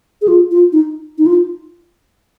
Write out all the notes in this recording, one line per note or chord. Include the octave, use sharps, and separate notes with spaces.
G#4
F4
F4
D#4
D#4
F4